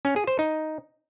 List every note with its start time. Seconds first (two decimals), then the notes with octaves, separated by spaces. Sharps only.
0.05 C#4
0.16 G#4
0.27 C5
0.39 D#4